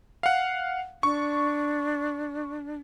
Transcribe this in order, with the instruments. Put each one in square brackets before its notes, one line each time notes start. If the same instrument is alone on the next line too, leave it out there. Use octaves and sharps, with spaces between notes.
[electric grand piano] F5 F#5
[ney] D4 [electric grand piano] C#6